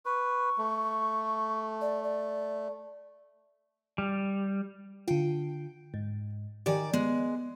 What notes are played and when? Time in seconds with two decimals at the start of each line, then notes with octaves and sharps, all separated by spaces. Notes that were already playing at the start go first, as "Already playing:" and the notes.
0.06 B4 C#6
0.58 A3
1.81 D5
2.04 D5
3.98 G3
5.08 D3 F4 G5
5.94 G#2
6.66 D#3 G4 D5 G5 G#5
6.93 G#3 B3